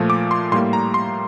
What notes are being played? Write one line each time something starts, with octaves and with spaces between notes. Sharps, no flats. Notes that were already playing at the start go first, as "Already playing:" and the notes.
Already playing: A#2 F3 A3
D6
C6
A2 G3 A#3 C6
A#5
C6